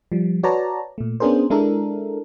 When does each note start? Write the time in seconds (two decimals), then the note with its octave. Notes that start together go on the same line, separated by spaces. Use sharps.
0.12 F3 G3
0.43 F#4 B4 C#5 D5 A5 A#5
0.98 A#2 A3
1.20 B3 C#4 D4 G#4 A#4 C5
1.50 G#3 D4 E4 A4 A#4